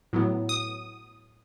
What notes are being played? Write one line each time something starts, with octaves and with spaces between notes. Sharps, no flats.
A2 F#3 B3
D#6